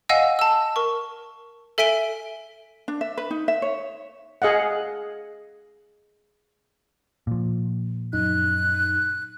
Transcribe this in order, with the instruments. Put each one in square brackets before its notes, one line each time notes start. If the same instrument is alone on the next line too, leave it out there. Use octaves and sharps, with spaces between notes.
[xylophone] D#5 F5 F#5 G#5 E6 A#6
A5 E6
A#4 C#6
A4 E5 G#5 B6 D7 G7
[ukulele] D4
E5
B4
D#4
E5
C#5
[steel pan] G#4 D#5 F5 F#5
[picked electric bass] A#2 F3
[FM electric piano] F#2 D#4 [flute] F#6